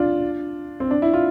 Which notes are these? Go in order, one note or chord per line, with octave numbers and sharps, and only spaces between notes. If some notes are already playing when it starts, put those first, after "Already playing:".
Already playing: D4 F4
C4
D4
E4
F4